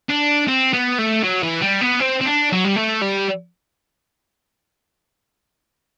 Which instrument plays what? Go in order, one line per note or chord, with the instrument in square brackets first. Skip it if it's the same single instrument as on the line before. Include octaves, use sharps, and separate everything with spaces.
[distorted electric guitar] D4
C4
B3
A3
F#3
E3
G3
B3
C4
C4
D4
F#3
G3
A3
G3